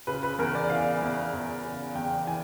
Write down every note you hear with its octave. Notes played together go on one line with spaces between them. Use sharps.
C#3 B4
B4
E2 A#4
D5
E3 F5
E2
E2
C#3
E2 G5
E3 G#5